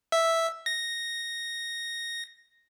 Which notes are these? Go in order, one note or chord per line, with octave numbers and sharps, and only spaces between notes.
E5
A#6